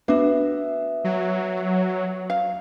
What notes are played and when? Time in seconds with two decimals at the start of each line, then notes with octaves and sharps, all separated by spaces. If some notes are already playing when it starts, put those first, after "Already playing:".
0.08 B3 D4 F#4 E5
1.04 F#3
2.30 F5